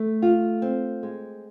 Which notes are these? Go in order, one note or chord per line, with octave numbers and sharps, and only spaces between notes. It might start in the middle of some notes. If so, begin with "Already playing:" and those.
Already playing: A3
F4
C4
G#3